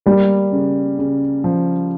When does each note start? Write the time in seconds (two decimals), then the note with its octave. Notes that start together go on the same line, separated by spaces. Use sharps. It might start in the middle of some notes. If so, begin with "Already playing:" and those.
0.06 G3 A#3
0.52 C#3
0.99 C#3
1.44 F3